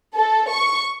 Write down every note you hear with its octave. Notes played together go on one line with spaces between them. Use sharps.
A4
C#6